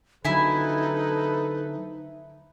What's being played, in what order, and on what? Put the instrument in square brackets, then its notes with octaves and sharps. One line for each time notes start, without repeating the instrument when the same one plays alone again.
[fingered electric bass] D3 F#3 [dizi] D#4 [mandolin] E4 G#5 [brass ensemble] A4 B4